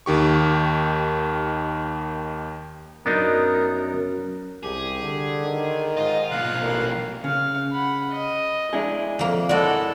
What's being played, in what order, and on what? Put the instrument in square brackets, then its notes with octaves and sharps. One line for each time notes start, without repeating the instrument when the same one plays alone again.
[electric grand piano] D#2 D#3 G4 C#6
[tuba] F#2 [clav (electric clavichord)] B3 D4 D#4 [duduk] A#4
[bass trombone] C2 [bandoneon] G4 [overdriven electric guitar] G#4
[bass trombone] D3 [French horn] G3
[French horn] D#3
[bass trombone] G#2 [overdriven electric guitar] F4 [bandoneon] D#5 D#6
[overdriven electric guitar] B1 A#2 [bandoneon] F5 F#6
[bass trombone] A1 [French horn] A#4
[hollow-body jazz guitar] C#3 [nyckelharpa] F5
[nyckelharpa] F#5 B5
D#5
[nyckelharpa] G#3 [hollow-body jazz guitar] D4 E4 G#4
[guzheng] F2 A#3
[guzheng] G#3 F#4 [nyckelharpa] E4 A4 [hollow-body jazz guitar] D5